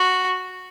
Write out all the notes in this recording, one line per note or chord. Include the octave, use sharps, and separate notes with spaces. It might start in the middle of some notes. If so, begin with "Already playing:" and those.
Already playing: F#4